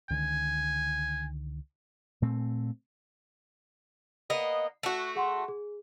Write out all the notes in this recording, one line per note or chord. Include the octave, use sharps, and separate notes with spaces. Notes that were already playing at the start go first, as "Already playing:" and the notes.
C#2 D3 D#3 G#5
A#2 A3 C4
A#3 B3 D#5
A3 F#4
G#4 F#5 C6
G#4